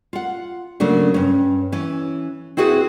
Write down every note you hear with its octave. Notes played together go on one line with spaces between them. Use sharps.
F4 F#5
C#3 F#3 A3 A#3 D4
G2 C#4
E3 C#4
C4 E4 F#4 G#4 B4